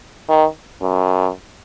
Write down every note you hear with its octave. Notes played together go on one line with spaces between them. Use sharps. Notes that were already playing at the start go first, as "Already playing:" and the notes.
D#3
F#2